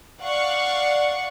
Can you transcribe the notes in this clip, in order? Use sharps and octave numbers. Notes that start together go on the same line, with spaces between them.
D5 F5 F#5 C#6